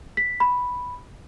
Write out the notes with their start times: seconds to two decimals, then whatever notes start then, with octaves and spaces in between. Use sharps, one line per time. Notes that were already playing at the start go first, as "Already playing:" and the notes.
0.17 B6
0.40 B5